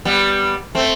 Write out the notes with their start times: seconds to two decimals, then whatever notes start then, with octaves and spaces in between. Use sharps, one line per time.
0.05 G3 B3
0.75 A3 C4